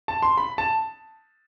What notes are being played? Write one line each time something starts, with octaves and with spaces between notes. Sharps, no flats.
A5
C6
B5
A5